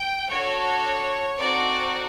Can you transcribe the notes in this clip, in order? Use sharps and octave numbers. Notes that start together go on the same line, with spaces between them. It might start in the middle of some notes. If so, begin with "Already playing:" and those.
Already playing: G5
D4 F#4 A4 C#5
C4 D#4 F#4 A4 D5